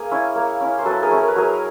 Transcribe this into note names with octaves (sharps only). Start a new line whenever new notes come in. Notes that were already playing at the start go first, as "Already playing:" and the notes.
Already playing: A#3 G#4
C#4 E4
A#3
C#4 E4
C5
F#3 A4 B4
G#4 A#4
A3 C#4 E4
A#4
B4
F#3 G#4 A#4